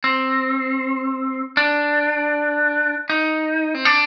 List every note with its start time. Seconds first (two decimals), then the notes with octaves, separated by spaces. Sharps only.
0.04 C4
1.57 D4
3.10 D#4
3.74 C4
3.85 D4